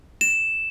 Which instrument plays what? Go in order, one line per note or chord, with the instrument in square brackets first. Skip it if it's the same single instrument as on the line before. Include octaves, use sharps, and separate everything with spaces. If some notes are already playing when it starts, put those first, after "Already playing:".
[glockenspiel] E7